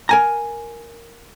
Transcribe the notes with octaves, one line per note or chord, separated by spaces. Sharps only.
A#4 G#5 A#5